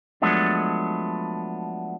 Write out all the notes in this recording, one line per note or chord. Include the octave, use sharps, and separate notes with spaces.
F3 F#3 G#3 A3 B3 D4